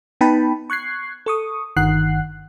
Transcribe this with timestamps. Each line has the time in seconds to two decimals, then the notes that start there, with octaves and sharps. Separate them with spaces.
0.21 B3 D#4 G5 A5 B5
0.70 C#6 F#6 G#6 C7
1.26 A4 C#6 D#6
1.77 G1 D#3 F#5 F#6 C7